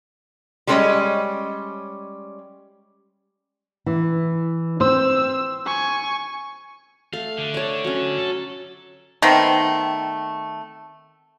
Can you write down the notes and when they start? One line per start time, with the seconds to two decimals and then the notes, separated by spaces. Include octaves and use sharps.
0.67 G3 G#3 C#4 A#4 C#5 D#5
3.86 E3
4.80 C4 C5 E6
5.66 G#5 C#6
7.13 A3 F5
7.37 D3
7.54 C#5 D5
7.84 F#3 C#4
8.18 A4
9.22 D#3 A3 B3 C4